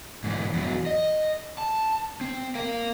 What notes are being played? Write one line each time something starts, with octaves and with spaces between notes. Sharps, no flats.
G#2 E3
E2 F#3
D#5
A5
C4
A#4 F5